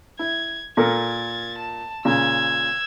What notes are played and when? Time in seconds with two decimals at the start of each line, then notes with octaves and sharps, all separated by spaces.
0.19 E4 G#6
0.77 A#2 A4 A#4 G#6 A6
1.57 A5
2.05 A#2 C#3 E6 G#6